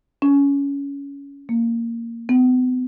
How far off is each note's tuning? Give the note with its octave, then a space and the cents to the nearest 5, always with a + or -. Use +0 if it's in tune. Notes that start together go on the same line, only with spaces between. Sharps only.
C#4 +20
A#3 -10
B3 +40